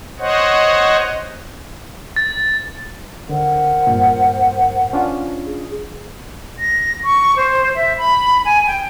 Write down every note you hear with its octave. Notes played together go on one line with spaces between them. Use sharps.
C5 C#5 D#5 F#5
A6
D3 A#4 C5 F#5
G2 A#2
C#4 D4 F4
G#4
A#6
C#6
C5
E5
B5
G#5
G5